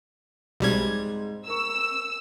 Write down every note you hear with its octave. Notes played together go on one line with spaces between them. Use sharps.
B1 G#2 G3 G#3 C4 G#6
A#4 C#6 E6